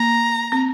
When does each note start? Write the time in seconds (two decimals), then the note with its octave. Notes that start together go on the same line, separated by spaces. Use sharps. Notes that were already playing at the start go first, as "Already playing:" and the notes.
Already playing: A#3 A#5
0.52 C4